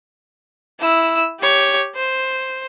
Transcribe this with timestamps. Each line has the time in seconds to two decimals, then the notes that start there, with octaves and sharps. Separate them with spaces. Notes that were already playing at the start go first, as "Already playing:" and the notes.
0.80 E4 E6
1.40 G4 C#5
1.95 C5